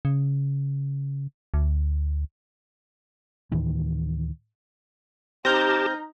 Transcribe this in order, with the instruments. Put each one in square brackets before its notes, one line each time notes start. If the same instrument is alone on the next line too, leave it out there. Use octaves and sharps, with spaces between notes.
[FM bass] C#3
D2
[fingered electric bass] D2 A2 D#3 E3
[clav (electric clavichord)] C4 [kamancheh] D#4 A#5 [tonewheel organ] G4 A5 [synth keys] F6 G6 A#6